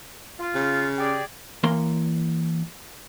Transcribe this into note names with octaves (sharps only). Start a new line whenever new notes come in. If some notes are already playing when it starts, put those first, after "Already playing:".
F4
C#3
G4 G#4 D5
E3 A#3 A#4 C#5 C6